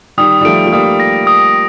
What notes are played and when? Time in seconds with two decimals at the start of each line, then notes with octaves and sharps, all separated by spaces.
0.18 D#3 G3 D#6
0.41 G3
0.45 F3 A3 D7
0.66 A3
0.72 G3 A#3 D#6
1.00 A#6
1.27 D#6